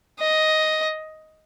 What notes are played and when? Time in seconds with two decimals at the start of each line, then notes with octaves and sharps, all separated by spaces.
0.20 D#5